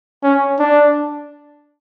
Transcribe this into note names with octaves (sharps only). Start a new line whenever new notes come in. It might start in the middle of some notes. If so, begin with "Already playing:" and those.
C#4
D4